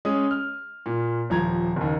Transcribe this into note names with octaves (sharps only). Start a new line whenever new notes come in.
G#3 C#4 D#6
F6
A#2
D#1 F3 A#5 G#6
F#1 D#2